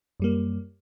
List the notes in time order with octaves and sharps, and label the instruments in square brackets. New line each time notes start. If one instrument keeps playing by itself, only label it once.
[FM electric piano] F#2 G3 A#3